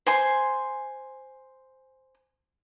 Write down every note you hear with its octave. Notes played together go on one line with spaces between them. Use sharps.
C5 G#5 C6